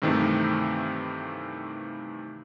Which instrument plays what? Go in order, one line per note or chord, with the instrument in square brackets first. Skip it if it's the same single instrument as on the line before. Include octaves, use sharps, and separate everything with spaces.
[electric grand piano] G2 C3 D#3 E3 A3